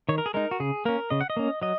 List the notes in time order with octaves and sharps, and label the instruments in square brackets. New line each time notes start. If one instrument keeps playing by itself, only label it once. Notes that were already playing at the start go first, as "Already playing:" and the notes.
[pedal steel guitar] D#3 C#5
A#4
G#4
G#3 D#4 A#4
F#4
C#3 G#4
A#3 C#4 A#4
C#3 D#5
F#5
D#5
A#3 C#4
F#3 D#5